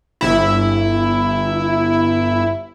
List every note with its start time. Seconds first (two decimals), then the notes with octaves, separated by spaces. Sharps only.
0.21 G1 E4